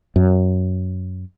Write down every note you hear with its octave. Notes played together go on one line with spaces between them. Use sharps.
F#2